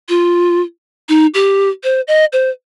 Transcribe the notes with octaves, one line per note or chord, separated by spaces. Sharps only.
F4
D#4
G4
C5
D#5
C5